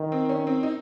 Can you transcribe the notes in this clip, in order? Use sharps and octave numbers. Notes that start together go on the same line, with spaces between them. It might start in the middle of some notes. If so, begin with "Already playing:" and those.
Already playing: D#3
C4
C#4
C4
D#4